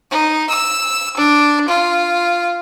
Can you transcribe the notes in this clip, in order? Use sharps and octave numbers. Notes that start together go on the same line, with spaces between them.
D#4
E6
D4
F4